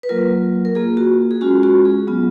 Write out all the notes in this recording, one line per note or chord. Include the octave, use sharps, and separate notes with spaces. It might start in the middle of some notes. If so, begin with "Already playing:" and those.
B4
F#3 A#3 F4 A#4
A#4
A#3 F4 G#4
F#4
G#4
G#3 C#4 F4 F#4
F#4
G#4
F#3 B3 F4